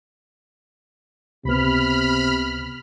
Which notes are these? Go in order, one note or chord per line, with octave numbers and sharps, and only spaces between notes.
C#2 C3 B3 B5 F6